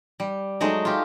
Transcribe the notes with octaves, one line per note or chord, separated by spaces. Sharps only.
G3
F#3 G#3 A3 D#4
F4 G4